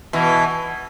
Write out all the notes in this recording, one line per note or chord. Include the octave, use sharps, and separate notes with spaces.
B2 E3